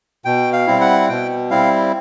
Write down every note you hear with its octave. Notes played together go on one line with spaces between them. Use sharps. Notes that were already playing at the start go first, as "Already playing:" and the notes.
B2 G5
F5
G3 C4 E4
F#5
B2 G5
G3 C4 E4 F5